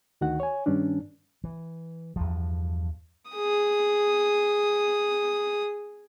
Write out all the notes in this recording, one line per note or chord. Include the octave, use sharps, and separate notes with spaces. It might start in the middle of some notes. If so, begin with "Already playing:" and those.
D2 D#3 F#4 F#5
C#5 G#5
G2 D#3 C#4 D4
E3
E2 G2 F3
G#4 D#6